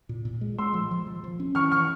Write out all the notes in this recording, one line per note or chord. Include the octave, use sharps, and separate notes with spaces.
A#2
A#2
G#3
G#3 C6 E6
F3
F3
F3
F3
C#4
E3 C#6 F6
E3 C#6 F6